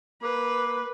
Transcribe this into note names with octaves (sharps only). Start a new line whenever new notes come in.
A#3 B4